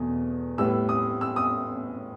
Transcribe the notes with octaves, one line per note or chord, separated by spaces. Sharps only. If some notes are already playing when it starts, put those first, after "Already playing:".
Already playing: E2 B2 A3 D#6
A2 G3 B3 E6
D#6
E6
D#6